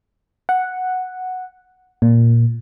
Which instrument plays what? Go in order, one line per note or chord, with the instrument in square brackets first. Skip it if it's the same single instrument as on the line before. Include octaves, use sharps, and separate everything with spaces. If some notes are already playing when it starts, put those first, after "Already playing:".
[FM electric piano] F#5
A#2